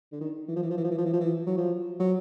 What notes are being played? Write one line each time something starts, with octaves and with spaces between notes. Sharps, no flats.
D3
D#3
E3
F3
E3
F3
E3
F3
E3
F3
E3
F3
E3
F#3
F3
F#3